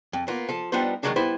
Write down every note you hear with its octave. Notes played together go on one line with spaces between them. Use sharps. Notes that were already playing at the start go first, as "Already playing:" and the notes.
F2
A#3 B3 F4
F3 A4
G3 B3 D4 D#4 F4 C5
D#3 F3 F#3 G#3 A#3 D4
G3 B3 E4 B4 C5